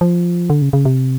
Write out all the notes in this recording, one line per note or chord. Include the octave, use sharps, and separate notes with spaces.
F3
D3
C#3
C#3
C3